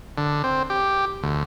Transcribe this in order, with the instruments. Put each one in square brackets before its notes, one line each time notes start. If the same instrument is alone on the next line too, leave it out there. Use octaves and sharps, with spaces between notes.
[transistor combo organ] D3
C4
G4
D2